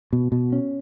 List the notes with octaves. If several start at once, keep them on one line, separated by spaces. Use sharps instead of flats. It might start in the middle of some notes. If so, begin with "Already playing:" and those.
B2
B2
C#4